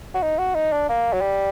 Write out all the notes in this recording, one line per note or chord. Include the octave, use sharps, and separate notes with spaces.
F#4
D#4
F#4
D#4
D4
A#3
F#3
G3